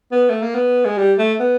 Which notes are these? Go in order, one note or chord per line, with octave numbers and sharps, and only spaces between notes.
B3
A3
A#3
B3
G#3
G3
A3
B3